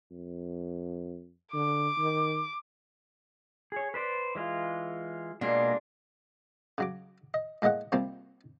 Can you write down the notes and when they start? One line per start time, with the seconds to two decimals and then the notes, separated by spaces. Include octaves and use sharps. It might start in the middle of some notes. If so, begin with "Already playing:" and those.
0.11 F2
1.54 D3 D6
1.98 D#3
3.72 G#4 C#5
3.94 B4 C5 D5
4.35 E3 G#3 F4
5.41 B2 G#3 A#3 D4 F4
6.78 C#3 F#3 D6
7.34 D#5
7.62 A2 G#3 A#3 D#5 F#5
7.92 C3 F3 G3 A#3 C4 G4